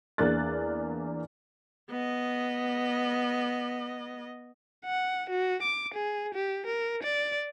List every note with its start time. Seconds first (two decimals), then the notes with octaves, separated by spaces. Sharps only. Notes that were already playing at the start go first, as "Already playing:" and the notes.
0.18 E2 A#3 D4 F#6 A6
1.90 B3 D#5
4.85 F#5
5.30 F#4
5.62 D6
5.94 G#4
6.34 G4
6.66 A#4
7.03 D5